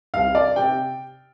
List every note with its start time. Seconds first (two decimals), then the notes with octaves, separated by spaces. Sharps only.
0.14 C2 C3 F5
0.35 D5
0.56 C3 G5